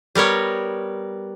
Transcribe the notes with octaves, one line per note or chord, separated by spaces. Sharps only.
G3 B3 A#4 C#5